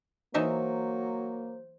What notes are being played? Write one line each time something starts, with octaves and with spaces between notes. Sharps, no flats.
E3 F#3 A#3 D#4 C5 E5